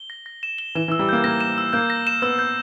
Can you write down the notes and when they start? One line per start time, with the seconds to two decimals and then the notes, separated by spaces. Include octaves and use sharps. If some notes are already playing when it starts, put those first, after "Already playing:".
Already playing: G7
0.10 A#6
0.26 A#6
0.43 E7
0.58 G7
0.75 E3 E7
0.88 E3
0.92 E6
0.99 G3
1.09 A#3 G6
1.24 A#3 A#6
1.40 E7
1.58 E6
1.73 A#3 G6
1.90 A#6
2.07 E7
2.22 B3 E6
2.39 G6